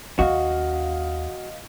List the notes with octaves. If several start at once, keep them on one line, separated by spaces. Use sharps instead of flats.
D#2 C#4 F#4 D#5 F5